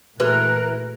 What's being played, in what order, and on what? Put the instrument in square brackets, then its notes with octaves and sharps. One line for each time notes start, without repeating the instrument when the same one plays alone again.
[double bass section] A#2 A3 [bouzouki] E3 [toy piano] F#4 G#4 B4 [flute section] A#4 F#6